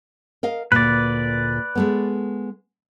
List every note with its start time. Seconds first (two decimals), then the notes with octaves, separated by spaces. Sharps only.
0.43 A#4 D#5 F5
0.72 D2 A#2 B4 D5
1.75 G#3 A3 B3